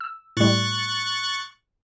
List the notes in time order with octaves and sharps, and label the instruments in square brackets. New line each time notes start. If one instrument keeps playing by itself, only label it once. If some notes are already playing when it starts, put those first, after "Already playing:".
[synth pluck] E6
[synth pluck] A2 G3 [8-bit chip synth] C#6 F#6 A6